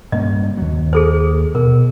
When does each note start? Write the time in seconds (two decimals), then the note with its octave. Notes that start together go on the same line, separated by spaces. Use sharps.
0.12 G2 A#3 C#4 D#5
0.57 D#2 F#3
0.93 G#4 A4 C5
1.55 B2 A#4